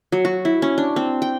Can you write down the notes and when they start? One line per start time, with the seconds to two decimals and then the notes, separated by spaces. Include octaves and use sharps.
0.12 F#3
0.25 F#4
0.45 E4
0.62 C#4
0.78 D4
0.96 C4
1.22 G5